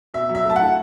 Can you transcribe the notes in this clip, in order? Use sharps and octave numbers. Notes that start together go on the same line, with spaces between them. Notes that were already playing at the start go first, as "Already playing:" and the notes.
B2 E5
F#3
E5
A3 A5
F#5
E4